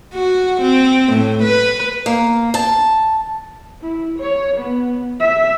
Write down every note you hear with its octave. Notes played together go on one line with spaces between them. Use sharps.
F#4
C4
A2
B4
A#3
A5
E4
C#5
B3
E5